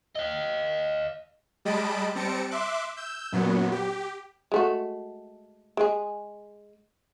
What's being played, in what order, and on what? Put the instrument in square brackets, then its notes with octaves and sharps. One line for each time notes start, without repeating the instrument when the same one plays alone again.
[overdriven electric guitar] D#5 F5
[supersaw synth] G3 G#3 D#5 A5 B5 D7
G3 C4 A5 A#6 C#7 D7
E5 C6 D6 F#6
E6 G6
F#2 A#2 F#3 B3
G4
[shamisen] G#3 A3 F#4
G#3 G#4